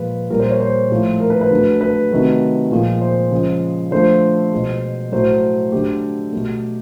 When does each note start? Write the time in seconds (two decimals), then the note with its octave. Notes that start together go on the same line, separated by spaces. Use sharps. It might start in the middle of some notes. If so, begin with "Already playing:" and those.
Already playing: A#2 F3 G#3 B4
0.30 A#2 G3 A#4
0.40 C5
0.50 C#5
0.60 C5
0.90 A2 F3 A3
1.20 A#4
1.30 B4
1.41 B4
1.51 D3 F#3 A3
1.81 B4
2.11 C3 D#3 F#3 A3
2.71 A#2 F3 G#3
3.01 C5
3.31 C#3 F3 G#3
3.91 D3 F3 A3 C5
4.52 B2 G#3
5.12 A2 F#3 A3 C5
5.72 D3 F#3 A3 G4
6.33 B2 F#3 A3